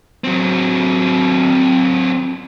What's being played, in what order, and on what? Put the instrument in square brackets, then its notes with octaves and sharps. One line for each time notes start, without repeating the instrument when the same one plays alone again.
[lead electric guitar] F#3 C4